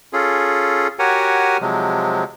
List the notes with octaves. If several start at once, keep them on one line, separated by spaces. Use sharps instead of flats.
C#4 F4 G#4 A4
F#4 G4 A#4 C#5 F#5 G#5
C3 F3 F#3 G#3